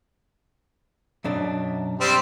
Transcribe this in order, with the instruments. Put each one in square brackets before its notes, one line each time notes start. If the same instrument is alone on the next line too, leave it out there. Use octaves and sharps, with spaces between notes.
[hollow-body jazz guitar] F#2 B2 D4
[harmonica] G3 C4